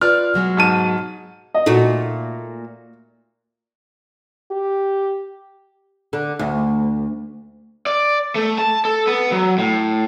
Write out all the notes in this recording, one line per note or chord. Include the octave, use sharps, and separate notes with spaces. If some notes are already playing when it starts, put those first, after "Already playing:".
F4 B4 D5 F6
B2 F#3 G#3
G#2 A5 D#7
D#5
A#2 A3 D#4 F#4
G4
D3
D2
D5
A3
A5
A4
B3
F#3
A2